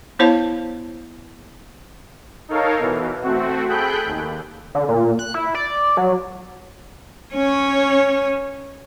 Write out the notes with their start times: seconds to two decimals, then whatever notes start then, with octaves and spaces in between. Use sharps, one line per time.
0.19 B3 E4 C5 C#5 F5 A5
2.49 D#4 A4 A#4 C#5 F5
2.79 B2 E3
3.22 A3 C4 F#4
3.67 G#4 A4 G5 B5 F#6 G6
4.06 D#2
4.75 D3
4.89 A#2
5.19 F#6
5.34 E4
5.55 D5
5.97 F#3
7.34 C#4 C#5